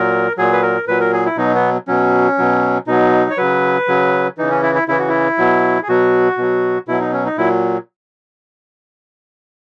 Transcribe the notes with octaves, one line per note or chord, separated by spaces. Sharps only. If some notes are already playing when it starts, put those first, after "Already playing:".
Already playing: A#2 F#3 A#4
A#2 F#3 G#4
B4
A#4
A#2 F#3 B4
A#4
G#4
E4
B2 F#3 D#4
B3
B2 F#3 C#4
B2 F#3
B2 F#3 D#4
C#5
C#3 F#3 B4
C#3 F#3
C#3 E3 D#4
C#4
E4
E4
C#3 E3 E4
F#4
E4
B2 F#3
G#4
B2 F#3 F#4
B2 F#3
B2 F#3 E4
D#4
C#4
D#4
A#2 F#3 E4